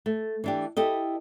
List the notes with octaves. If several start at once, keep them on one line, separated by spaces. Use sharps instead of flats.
A3
E3 D4 G4
E4 G4 A4 D#5